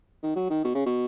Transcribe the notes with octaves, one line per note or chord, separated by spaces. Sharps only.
D#3
F#3
D#3
B2
C#3
B2